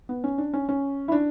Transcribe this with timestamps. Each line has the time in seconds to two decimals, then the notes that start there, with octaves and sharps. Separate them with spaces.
0.09 B3
0.24 C#4
0.38 D4
0.53 C#4
0.69 C#4
1.08 E4
1.12 D4